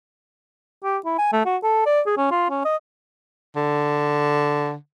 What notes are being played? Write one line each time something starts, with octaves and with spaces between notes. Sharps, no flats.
G4
E4
G#5
A3
F#4
A4
D5
G#4
C#4
F4
C#4
D#5
D3